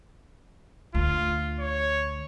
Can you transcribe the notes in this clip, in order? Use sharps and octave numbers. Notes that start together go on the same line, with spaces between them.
D2 F4
C#5